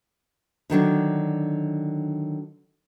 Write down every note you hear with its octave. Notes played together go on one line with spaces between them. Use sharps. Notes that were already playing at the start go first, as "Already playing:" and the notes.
D3 D#3 F#3 D4